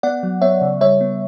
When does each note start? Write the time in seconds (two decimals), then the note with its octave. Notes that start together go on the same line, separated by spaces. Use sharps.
0.03 B3 D5 F#5
0.23 F#3
0.42 B3 C#5 E5
0.61 C#3
0.81 G3 C#5 E5
1.01 B3